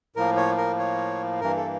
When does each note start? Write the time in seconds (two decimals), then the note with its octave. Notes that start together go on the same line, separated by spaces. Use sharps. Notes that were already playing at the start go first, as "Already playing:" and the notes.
0.16 A2 F3 A#3 A#4
0.37 C#5
0.58 A#4
0.78 C#5
1.41 G2 E3 A#3 A#4
1.56 A4